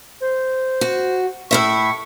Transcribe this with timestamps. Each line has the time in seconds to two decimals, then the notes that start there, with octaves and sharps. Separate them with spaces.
0.22 C5
0.81 F#4
1.51 A2 E4 E5 C#6